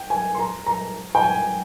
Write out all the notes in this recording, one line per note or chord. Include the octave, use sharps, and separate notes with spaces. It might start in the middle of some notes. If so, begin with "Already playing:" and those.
Already playing: G5
G#5
C6
A#5
A#5
G5
G#5